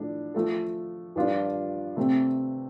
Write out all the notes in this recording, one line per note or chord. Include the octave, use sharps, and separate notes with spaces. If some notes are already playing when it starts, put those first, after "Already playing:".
Already playing: A2 F3 D4 A4
F3 A3 F4 A4
G2 F3 D4 F4
C3 A3 C4